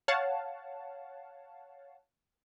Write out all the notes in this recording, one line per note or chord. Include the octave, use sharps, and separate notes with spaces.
C#5 F5 F#5 A5